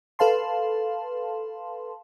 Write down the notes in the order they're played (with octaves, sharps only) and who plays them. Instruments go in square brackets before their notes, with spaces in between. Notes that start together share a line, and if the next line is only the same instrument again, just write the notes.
[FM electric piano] A4 B4 F5 A5 C6